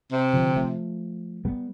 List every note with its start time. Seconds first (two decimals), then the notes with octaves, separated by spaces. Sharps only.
0.12 C3
0.34 D3 F3
0.56 F3 A3
1.45 G3 B3